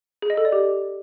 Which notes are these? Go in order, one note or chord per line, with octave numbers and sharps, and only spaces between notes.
G#4
D#5
A4
D5
G4